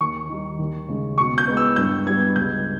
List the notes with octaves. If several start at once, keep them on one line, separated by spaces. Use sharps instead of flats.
D#2 C#6
D#3 G3
D#2
C#3 G#3
B2 C#6
G6
G#3 B3
E6
G2 G6
G3 B3 G#6
C#2 G6